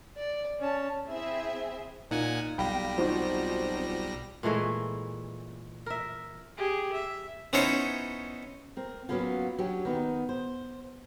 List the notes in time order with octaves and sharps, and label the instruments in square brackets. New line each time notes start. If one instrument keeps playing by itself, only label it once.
[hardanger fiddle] D5
C#4 A5
[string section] C4 E4 G#4 E5
[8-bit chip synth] A#2 F#5 G#5 [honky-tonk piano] D#4 F4
[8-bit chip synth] B1 G3 A#6 [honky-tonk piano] F5 G5 B5
[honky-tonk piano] F3 D#4 F#4 [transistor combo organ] C4 C5
[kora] A#2 E3 G#3 A3
A#4 E5
[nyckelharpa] G4 G#4
E5
[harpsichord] B3 C#4 D#4 E4 C5 C#5
[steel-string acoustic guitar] C4 A#4
F#3 G#3 A#3 B3 C#4 F4
F#3 C#4 D4 G4
D#3 B3 D#4
C5